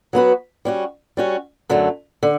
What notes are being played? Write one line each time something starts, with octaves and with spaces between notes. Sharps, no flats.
F#3 B3 F#4 B4
G3 C#4 F#4
G3 C#4 F#4
F#2 D3 F#3 A3
D3